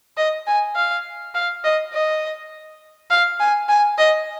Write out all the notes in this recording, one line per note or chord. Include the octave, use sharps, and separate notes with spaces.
D#5
G#5
F5
F5
D#5
D#5
F5
G#5
G#5
D#5